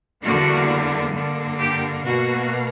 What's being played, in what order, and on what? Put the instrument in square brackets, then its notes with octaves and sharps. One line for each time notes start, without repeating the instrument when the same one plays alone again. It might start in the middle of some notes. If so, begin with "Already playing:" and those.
[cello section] E2 D3 G3 A#3 F#4
G2 D3 A#3
G4
B2 A#3 F#4